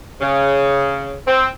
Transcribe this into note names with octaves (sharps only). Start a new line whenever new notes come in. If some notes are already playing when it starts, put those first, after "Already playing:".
C#3
C4